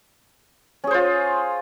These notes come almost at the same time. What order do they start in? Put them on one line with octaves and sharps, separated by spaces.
C#4 G#4 C5 F4